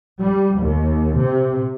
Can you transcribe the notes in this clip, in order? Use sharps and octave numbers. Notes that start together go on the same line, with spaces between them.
G3
D#2
C3